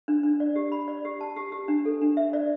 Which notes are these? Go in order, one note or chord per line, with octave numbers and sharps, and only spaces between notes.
D4
D4
D5
G4
B5
D5
G4
A5
G4
G4
D4
A4
D4
E5
D5